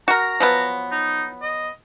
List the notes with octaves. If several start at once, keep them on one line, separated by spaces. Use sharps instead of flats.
F#4 A#4 A#5
F3 F#3 B3
D#4
D#5